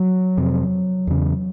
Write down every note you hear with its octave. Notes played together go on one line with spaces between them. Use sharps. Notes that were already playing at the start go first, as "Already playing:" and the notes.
Already playing: F#3
F2 C3
E2 C#3